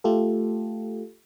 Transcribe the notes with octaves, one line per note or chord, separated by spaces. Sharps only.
A3 F4 G4 A4